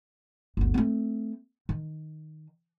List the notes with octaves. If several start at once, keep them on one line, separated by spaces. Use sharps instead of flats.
G1 D2
A3 C4
D#3